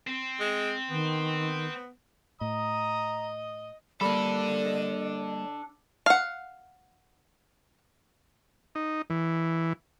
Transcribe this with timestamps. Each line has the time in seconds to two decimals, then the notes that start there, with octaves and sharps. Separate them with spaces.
0.07 C4
0.40 G#3
0.89 D#3 B3
2.41 A2 D#5 A#5 D#6
4.01 G3 A#3 D4 A4 D5 B5
4.66 D#5
6.06 F5 F#5
8.75 D#4
9.10 E3